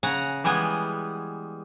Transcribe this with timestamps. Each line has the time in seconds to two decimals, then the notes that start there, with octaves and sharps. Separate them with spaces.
0.03 C#3 F#5 G#5 A#5
0.44 E3 G3 G#3 B3 G#5